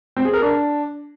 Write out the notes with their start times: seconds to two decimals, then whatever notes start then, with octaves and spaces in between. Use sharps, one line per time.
0.17 C4
0.25 G#4
0.33 A#4
0.42 D4